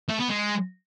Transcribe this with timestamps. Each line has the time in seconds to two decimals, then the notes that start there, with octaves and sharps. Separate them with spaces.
0.09 A3
0.19 B3
0.29 G#3